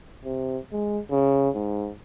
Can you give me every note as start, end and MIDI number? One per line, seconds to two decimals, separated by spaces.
0.25 0.58 48
0.72 1.00 56
1.11 1.49 49
1.55 1.91 44